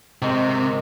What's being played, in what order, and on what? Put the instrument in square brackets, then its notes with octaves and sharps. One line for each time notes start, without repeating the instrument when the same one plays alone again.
[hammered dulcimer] G#2 D#3 [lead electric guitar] C3